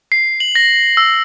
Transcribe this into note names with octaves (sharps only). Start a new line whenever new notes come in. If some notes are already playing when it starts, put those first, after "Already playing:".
C7
F#7
A#6
E6